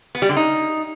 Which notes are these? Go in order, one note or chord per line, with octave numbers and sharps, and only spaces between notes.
B3
G3
D3
D#4